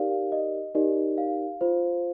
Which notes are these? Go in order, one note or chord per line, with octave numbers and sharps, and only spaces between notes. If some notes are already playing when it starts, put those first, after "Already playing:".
Already playing: D#4 G4 A#4 D5 F5
D#5
D#4 G4 A#4 D5 D#5
F5
F4 C5